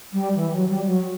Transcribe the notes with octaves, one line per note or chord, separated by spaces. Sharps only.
G3
E3
F#3
G3
F#3